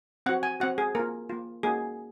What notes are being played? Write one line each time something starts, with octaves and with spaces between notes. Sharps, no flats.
C4 F#4 F#5
G#5
C4 F#4 F#5
G#4
A#3 F4 A#4
A#3 F4
A#3 D#4 F#4 G#4